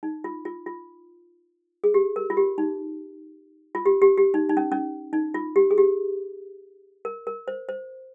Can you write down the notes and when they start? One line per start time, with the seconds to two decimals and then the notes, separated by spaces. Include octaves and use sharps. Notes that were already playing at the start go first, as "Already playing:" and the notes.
0.03 D#4
0.24 F4
0.45 F4
0.66 F4
1.84 G#4
1.94 G4
2.16 A#4
2.30 F4
2.37 G4
2.58 D#4
3.75 F4
3.86 G4
4.02 G4
4.18 G4
4.34 D#4
4.49 D#4
4.57 C#4
4.72 C#4
5.13 D#4
5.34 F4
5.56 G4
5.71 G#4
5.78 G4
7.05 A#4
7.27 A#4
7.48 C5
7.69 C5